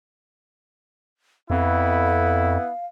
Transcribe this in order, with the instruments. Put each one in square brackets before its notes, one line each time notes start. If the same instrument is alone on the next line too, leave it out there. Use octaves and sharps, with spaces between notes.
[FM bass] F2 [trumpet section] B3 E4 [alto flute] F5